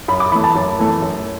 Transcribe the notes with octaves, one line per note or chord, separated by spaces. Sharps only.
F#2 B5
D6
E3 A3 B5
A5
F#2
E3 A3
F#2